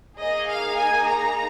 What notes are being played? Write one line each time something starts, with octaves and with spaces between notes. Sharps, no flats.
A#3 D#4 G#4 D#5
F5
G#5
A#5